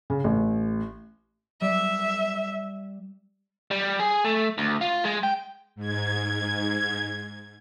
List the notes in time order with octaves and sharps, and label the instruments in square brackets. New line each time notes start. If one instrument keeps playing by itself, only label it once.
[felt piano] C#3
A1
[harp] G3 [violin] E5
[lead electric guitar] G3
G#4
A3
D2
F4
G#3
G5
[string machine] G#2 G#6